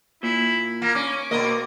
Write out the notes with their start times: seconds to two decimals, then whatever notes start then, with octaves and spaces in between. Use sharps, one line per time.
0.23 A#2 E4
0.82 A#3 A#4
0.95 C#4 D6
1.31 B2 A#3 A#4 D#5